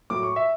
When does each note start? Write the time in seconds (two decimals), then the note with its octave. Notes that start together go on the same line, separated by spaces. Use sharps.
0.10 A2 F#3 D6
0.23 C#6
0.36 E5